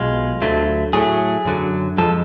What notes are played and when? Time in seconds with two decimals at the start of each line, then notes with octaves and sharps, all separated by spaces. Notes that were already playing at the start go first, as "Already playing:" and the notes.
Already playing: B1 B2 G#3 F4
0.42 D2 D3 F#3 A3
0.93 A2 F#3 A3 G#4
1.45 F#2 D3 F#3
1.97 F2 F3 G#3 A4